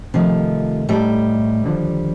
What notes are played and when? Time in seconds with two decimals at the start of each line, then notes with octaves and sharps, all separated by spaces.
0.14 C3 D#3 F3 A3 D#4
0.89 A2 G3 A3 D#4 A4
1.64 D#2 D3 F3